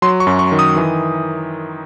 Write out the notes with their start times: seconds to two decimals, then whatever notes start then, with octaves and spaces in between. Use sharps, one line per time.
0.02 F#3 C6
0.20 C#6
0.27 F#2
0.39 C#6
0.52 D#3
0.59 D#6
0.76 E3